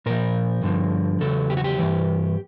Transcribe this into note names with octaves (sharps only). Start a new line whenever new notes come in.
A#2 F3 A#4
G2 D3 F3
E2 C#3 F#3 A4
G4
F#4
G4
G2 E3